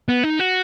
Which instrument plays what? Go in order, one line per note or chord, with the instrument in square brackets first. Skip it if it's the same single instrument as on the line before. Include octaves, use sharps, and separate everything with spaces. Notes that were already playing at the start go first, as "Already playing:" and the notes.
[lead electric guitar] B3
D#4
F#4